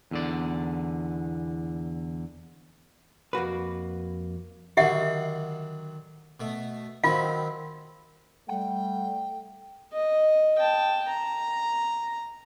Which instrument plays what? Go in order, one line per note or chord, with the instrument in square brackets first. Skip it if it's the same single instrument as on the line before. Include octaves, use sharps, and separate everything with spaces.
[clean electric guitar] E2 D3 D5
[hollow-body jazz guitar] F2 A#3 F#4 B4
[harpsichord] D3 D#3 F#3 [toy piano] G4 E5 F#5
[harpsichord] B2 A3
[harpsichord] D#3 F#3 C4 [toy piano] F4 F5
[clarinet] G3 [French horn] A3 [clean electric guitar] F#5 [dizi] G5
[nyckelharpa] D#5
G5 A5
A#5